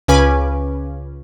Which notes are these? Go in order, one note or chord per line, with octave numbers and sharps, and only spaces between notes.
C#2 C#3 C#4 B4 G#5 D6